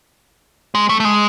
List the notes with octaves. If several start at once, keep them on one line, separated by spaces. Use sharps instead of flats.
G#3
A3
A3
G#3